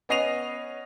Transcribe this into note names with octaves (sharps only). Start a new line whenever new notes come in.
B3 C#4 D#5 C7 D#7 F7